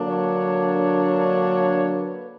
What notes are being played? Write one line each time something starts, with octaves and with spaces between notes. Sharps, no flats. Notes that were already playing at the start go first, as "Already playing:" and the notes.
Already playing: D3 F#3 A#3 D4
C#5
B4